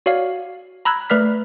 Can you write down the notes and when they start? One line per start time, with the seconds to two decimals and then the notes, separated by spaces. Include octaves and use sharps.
0.06 F#4 C#5 D5 F5
0.85 A#5 B5 E6 F#6 G#6
1.10 A3 B4 D5 F6 B6